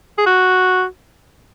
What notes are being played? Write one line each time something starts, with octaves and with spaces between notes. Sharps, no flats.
G#4
F#4